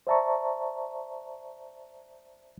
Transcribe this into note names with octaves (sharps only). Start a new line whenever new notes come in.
C5 D5 E5 A5 A#5 C#6